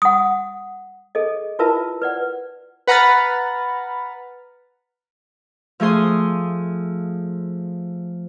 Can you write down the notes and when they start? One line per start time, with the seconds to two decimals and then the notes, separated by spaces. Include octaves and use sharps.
0.02 F#5 D#6
1.15 G#4 A4 D#5
1.59 E4 F4 A#4 B4 E5 A5
2.02 B4 D5 F#5
2.87 B4 F#5 A#5 B5 F6 A6
5.80 F3 A3 G#4 C6 D#6